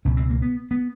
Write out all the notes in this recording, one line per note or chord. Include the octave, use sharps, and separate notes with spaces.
C#2 B2 C#4
C4
A#3
B3
B3